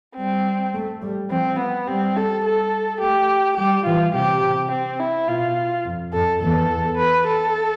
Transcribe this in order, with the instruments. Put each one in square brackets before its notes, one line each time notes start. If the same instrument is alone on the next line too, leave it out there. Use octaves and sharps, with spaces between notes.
[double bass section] G3 [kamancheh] C4
[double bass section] A3
G3
[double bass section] F3 [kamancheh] C4
[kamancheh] B3
[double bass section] G3 [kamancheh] C4
[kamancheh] A4
A4
[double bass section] A3 [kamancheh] G4
[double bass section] G3 [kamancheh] G4
[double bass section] E3 [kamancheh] F4
[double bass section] C3 [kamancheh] G4
[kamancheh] C4
E4
[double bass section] B2 [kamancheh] F4
[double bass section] F2
[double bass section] F2 [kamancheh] A4
[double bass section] E2 [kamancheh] A4
[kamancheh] B4
A4